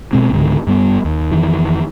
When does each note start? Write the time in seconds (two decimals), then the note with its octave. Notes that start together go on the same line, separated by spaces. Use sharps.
0.13 B2 G#3 C4
0.32 C#2 G#2 D3 D#3
0.67 G2 G3 B3
1.05 D#2
1.32 F2 D#3 E3